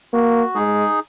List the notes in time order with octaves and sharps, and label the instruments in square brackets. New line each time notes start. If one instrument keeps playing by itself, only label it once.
[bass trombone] A#3 [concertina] F#4
[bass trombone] G#3 [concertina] D#4 G#4